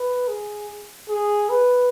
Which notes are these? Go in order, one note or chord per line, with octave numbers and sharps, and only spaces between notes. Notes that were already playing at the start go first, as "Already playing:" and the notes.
Already playing: B4
G#4
G#4
B4